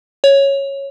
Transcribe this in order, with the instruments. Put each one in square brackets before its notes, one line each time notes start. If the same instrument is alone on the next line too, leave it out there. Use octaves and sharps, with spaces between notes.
[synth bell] C#5